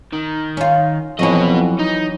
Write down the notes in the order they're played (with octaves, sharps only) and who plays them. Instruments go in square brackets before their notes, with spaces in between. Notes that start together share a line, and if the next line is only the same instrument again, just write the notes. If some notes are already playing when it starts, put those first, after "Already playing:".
[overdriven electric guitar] D#3
[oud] C#4 F4
[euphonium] F2 [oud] E3 F#3 [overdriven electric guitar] B3 D#5
[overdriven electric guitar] D#4